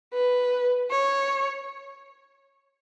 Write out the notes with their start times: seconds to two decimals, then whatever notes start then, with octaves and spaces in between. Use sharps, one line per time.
0.14 B4
0.91 C#5